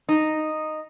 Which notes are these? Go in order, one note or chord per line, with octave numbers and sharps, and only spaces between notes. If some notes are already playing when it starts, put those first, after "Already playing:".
D#4